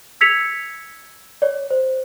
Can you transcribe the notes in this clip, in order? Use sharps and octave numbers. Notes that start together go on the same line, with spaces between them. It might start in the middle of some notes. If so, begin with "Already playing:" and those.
E6 G#6 B6 C#7 F7
C#5 D5
C5